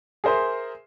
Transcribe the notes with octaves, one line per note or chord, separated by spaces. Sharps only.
G#4 A#4 C5 E5 C6